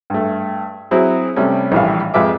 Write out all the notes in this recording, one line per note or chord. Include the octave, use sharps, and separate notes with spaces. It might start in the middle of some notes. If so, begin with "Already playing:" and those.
G2 A3
F#3 C4 E4 G#4
C3 G3 A3 C#4
A#1 A2 E3 G3 F5
F2 G#3 F4 B4 E5 D6